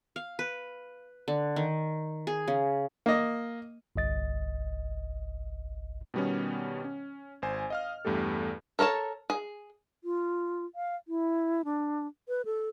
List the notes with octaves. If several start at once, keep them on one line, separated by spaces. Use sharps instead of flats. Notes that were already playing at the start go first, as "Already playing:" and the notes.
F5
B4
D3
D#3
G#4
C#3
A#3 D#5
G1 C2 D#5 A6
B2 D#3 G3 B3 C#4
C#4
G#1 C5 G#5
D#5 F5 F6
E2 G2 A3 G4 A4
A4 A#4 C#5 A5
G#4
F4
F5
E4
D4
B4
A4